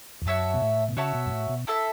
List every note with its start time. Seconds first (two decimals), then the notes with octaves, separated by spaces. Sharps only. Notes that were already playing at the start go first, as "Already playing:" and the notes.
0.22 E2
0.26 F#2 F#4 C#5 E5 A5
0.54 B2
0.62 A2
0.89 B2
0.97 C#3 F#4 C#5 E5 A5
1.15 B2
1.26 F#2
1.31 A2
1.49 B2
1.67 E4 A4 E5 A5